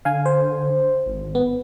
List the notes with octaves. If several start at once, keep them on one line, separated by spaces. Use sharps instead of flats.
D3 F5 G#5
C5
G#1
B3